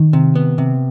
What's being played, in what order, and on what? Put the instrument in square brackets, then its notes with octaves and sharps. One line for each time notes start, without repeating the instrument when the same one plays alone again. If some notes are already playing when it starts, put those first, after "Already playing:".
Already playing: [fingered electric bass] D#3
[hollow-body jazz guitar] C3
B3
C3